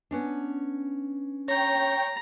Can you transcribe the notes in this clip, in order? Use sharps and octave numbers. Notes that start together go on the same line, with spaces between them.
B3 C#4 D4
C#5 G5 A#5